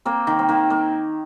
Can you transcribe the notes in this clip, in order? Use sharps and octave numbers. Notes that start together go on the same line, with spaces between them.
A#3 C4
D#3
C4
D#3 A#3
A#3